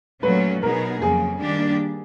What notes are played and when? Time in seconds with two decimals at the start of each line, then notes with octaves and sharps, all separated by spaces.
0.23 A#2 F#3 A3 C#4 B4
0.62 B2 F#3 B3 D#4 G#4 A#4
1.01 F2 C#3 F#3 A#3 G#4
1.41 D#3 G3 A#3 D4 G4